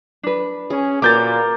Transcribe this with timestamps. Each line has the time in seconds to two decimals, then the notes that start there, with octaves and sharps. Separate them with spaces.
0.23 D4 B4
0.70 C#4 G#4
1.02 A#2 A#3 F#4 A#4 B4 D6 G6 A6